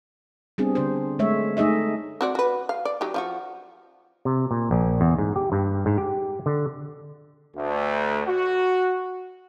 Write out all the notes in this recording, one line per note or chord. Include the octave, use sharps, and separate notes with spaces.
G3 B3 C4 D4 G#4
D3 D4 C5
G#3 A3 C#5 E5
A3 D#4 G#4 D#5 E5
C4 F#4 D5
F#4 B4
F5
D5
F#3 D#4 G4
F3 F4 F#4
C3
A#2
A#1
E2
G#2
G4
G2
G#2
G4
D3
D2
F#4